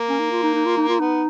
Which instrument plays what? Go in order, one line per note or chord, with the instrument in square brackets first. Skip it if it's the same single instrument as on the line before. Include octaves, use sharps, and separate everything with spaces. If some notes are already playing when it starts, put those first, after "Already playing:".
Already playing: [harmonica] A#3
[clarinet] C#4
D#4
F4
D#4
D#4
F4
D#4
F4
[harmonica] B3 [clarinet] D#4